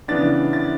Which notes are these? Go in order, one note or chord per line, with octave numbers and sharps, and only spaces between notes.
C#3 E3 B3 D4 A6
A6